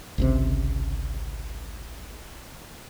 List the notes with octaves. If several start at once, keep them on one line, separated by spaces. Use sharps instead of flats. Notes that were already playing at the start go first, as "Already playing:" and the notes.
G#1 C#2 C3